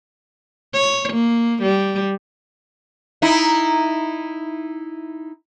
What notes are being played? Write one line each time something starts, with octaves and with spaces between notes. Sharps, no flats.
C#5
A#3
G3
D#4 E4